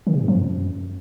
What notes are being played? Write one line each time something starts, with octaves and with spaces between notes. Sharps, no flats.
D#3
C3
G#2
F3
F#2